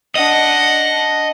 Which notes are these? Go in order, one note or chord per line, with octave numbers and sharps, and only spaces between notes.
D4 D#5 F#5